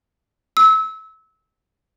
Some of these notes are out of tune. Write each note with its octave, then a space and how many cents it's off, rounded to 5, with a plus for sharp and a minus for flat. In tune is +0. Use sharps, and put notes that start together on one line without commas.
E6 -25